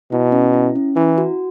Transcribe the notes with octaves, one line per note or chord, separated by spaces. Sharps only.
B2 E4
C#4
E4
C#4
E3 E4
F#4